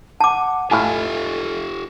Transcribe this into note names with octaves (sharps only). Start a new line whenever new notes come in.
F#5 A5 D6
A2 F4 G4 A4 E5 F5 G#5